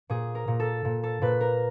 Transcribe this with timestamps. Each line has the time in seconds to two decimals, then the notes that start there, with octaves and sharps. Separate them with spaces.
0.09 A#2 G#4
0.35 A#4
0.48 A#2
0.60 A4
0.85 A#2
1.03 A4
1.22 A#2 B4
1.41 A#4